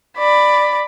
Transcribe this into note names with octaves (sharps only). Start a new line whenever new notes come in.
D5 B5